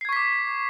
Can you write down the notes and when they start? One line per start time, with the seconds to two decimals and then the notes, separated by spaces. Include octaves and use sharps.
0.01 C7
0.05 G#6
0.09 C#6
0.13 B6
0.16 D6